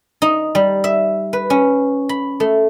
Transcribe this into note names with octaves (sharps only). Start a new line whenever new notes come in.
D#4
G3
E5
B4
C#4
B5
A3